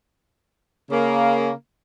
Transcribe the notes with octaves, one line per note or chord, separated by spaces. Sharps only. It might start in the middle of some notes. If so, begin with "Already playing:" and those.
C#3 A#3